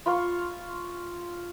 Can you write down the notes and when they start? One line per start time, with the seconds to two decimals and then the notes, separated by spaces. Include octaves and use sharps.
0.06 F4 F5 C6 C#6